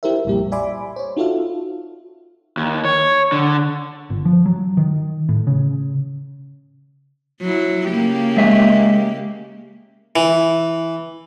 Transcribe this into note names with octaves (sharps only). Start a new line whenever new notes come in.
E4 G4 A#4 C5 E5
B1 F2 A#2 G3 G4
D5 E5 G#5 B5 C6 D6
C5 C#5
D#4 F4 F#4 A4 E5 F5
D#2
C#5
D3
G1
F3
F#3
D#3
A2
C#3
F#3 E4
C#3 A#3 G4
G#3 D#5 E5
E3